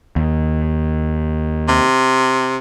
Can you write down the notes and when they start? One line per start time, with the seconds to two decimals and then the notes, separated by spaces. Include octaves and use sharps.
0.16 D#2
1.68 C3